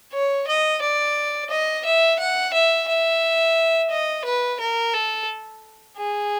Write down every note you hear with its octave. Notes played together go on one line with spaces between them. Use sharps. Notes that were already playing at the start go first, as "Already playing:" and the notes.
C#5
D#5
D5
D#5
E5
F#5
E5
E5
D#5
B4
A#4
A4
G#4